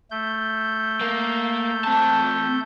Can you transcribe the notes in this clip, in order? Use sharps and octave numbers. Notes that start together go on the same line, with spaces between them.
A3 G6
A#3
C4 A5